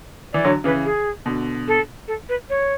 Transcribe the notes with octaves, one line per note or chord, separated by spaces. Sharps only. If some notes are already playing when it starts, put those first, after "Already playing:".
E3 D5
D3 F#3 C#5
C#3 E3 B4
G#4
B2 D3
A4
A4
B4
C#5